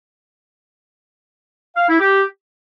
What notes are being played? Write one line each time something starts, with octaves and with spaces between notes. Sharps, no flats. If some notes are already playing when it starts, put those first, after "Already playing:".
F5
E4
G4